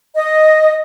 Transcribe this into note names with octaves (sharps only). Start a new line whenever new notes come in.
D#5